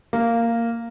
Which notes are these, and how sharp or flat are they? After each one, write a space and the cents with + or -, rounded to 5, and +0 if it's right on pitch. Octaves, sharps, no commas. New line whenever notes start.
A#3 -10